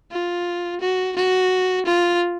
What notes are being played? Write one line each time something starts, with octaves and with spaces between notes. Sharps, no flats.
F4
F#4
F#4
F4